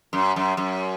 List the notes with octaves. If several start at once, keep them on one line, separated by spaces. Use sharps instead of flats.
F#2
F#2
F#2